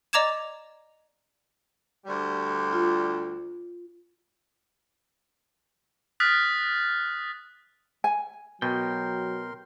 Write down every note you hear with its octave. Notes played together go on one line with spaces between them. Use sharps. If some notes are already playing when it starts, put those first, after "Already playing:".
D5 D#5 A#5 D6 G#6 E7
D2 G3
F4
D#6 F6 F#6 A6 B6
G#5
B2 F#3 G4 A#4 G5 C6